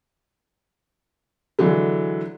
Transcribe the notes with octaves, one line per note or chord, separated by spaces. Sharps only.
D3 E3 F#3 G#3